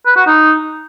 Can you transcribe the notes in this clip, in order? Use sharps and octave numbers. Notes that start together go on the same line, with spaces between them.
B4
F#4
D#4